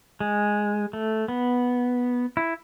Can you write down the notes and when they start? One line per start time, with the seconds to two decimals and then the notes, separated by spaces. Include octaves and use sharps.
0.20 G#3
0.93 A3
1.28 B3
2.37 E4